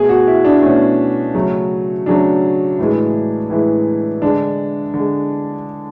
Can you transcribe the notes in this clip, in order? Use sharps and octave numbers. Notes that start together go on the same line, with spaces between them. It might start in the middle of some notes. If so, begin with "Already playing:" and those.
Already playing: B2 A3 G#4
F#4
E4
D4
B2 A3 C#4
C#3 F#3 A3
C#3 F#3 A3 D4
A2 E3 G#3
A2 E3 G#3
D3 G#3 D4
D3
G#3